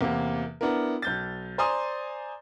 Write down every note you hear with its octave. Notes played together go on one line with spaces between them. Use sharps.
E2 C3 A#3
B3 D4 E4 A#4
B1 G6 A6
C5 D5 G#5 A#5 C6 D#6